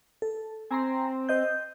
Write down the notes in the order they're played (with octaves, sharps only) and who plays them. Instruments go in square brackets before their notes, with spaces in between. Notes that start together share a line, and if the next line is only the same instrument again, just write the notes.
[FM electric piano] A4
[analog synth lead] C4 [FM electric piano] G#5 A#5 C6
[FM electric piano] C5 D#5 G6